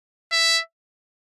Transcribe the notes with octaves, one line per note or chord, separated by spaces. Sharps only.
E5